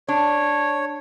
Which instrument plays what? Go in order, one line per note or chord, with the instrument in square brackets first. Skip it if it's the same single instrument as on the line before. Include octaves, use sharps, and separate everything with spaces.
[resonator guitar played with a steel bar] D4 [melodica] C#5